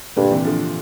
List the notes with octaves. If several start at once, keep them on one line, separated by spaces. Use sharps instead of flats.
G2 A#2 D3
C3 E3
D3 F3